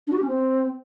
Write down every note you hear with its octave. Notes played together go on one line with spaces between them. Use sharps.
D4
F#4
G4
C#4
C4